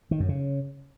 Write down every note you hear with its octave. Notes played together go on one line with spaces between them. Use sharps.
D#3
F#2
C#3